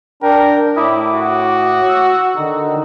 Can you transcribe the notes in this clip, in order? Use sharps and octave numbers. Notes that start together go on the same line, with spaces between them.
D4 A#4 G5
A2 E4 D6 D#6
F#4
E6
D3 D#3 D#4